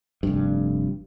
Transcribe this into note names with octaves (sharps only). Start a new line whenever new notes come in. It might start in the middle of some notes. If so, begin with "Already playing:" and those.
F1 G2